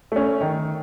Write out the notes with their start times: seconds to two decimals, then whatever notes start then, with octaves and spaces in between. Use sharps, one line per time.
0.12 A3 C#4
0.41 D#3